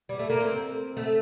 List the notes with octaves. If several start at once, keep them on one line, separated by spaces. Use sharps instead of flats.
G3
A3
A#3
C4
A3